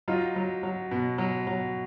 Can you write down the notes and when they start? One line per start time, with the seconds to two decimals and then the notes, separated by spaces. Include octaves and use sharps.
0.08 F#3 D#4 F4
0.36 F#3
0.63 F#3
0.91 B2
1.18 F#3
1.47 F#3